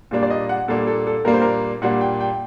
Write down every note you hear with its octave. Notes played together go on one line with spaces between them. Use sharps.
A#2 G3 A#3 D4
D5
D#5
F#5
A#2 G3 A#3 D4 A4
A4
A4
A#2 G3 A#3 D4 A#4
C5
A#4
A#2 G3 A#3 D4 F#5
G5
G5